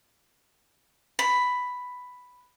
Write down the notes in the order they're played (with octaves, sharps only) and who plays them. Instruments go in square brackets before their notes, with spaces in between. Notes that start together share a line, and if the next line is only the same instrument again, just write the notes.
[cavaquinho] B5